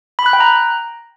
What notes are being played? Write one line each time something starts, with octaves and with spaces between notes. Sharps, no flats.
B5
F#6
G5
A#5